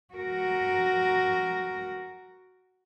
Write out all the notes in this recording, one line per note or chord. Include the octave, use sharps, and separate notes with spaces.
F#4 A#4